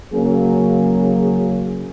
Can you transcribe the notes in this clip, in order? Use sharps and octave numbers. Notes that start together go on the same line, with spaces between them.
C#3 F#3 A#3 C#4 G#4